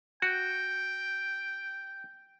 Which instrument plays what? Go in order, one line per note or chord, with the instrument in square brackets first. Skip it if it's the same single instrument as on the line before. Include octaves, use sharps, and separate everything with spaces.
[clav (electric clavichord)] F#4 [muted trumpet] G5